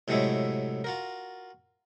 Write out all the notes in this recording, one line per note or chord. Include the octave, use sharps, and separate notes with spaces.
A2 C3 F#3 G#3 A3 E4
F4 F#4 A#4